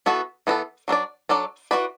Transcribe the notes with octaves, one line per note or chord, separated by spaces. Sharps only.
E3 B3 F#4 A4
E3 B3 F#4 A4
F#3 D4 A4 D5
F#3 D4 A4 D5
E3 D4 F#4 B4 D5